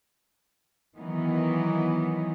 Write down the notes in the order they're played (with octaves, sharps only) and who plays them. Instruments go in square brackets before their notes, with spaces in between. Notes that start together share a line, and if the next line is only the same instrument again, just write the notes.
[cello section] D#3 E3 F#3 B3 D#4